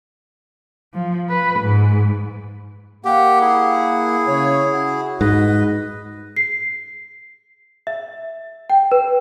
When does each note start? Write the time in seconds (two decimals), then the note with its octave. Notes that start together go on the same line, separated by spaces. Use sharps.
0.94 F3
1.30 B4
1.60 G#2
3.05 A#3 G4 F#5
3.41 E4 G#4
4.28 C#3 C#5
4.72 F#4
5.21 G#2 B4 D#5
6.36 C7
7.87 E5
8.70 G5
8.92 B4